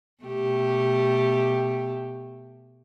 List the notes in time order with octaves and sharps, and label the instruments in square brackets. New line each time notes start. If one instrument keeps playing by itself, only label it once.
[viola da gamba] B2 A3 G4